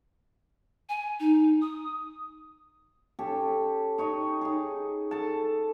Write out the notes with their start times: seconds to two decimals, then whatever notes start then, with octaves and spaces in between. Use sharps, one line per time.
0.89 G#5
1.20 D#4
1.62 D#6
3.19 C#4 G4 A4
3.98 D#4 C#5 D#5
4.41 D#4 G#4
5.11 A4 A5